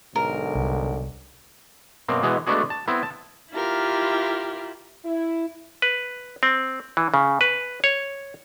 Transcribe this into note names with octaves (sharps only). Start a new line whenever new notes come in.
B1 G#2 D3 A#4
C2
F#2 B2 A#3 C4
B2 E3 G#3 B3
G#3 A3 B3 D4 F#4 G#4
A5
B3 C4 E4
A5
E4 F4 G4 A#4
E4
B4
C4
E3
C#3
B4
C#5